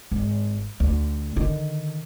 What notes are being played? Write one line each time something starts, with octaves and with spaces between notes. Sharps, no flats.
G#1
D2
D3 D#3